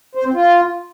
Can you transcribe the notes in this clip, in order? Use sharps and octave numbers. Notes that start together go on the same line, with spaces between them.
C5
C4
F4